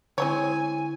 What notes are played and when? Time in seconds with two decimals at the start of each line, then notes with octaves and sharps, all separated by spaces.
0.18 D3 G#3 C4 E4 C#5 G#5